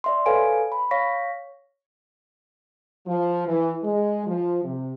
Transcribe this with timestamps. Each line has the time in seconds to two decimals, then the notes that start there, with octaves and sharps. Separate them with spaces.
0.04 D5 E5 C6
0.26 A4 B4 C#5 F5 G#5 D7
0.72 B5
0.91 C#5 F5 C#6 A#6 B6
3.07 F3
3.47 E3
3.83 G#3
4.27 F3
4.64 C3